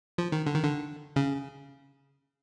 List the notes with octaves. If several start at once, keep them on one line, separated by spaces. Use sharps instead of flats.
F3
D#3
D3
D#3
D3
C#3